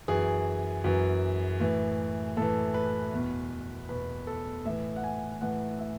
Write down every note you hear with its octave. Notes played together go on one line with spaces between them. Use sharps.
F#2 E3 G#4
F#2 E3
A2 E3
A2 E3 A4
B4
E2 B2
E2 B2 B4
A4
A2 E3 E5
F#5
G#5
A2 E3 F#5
E5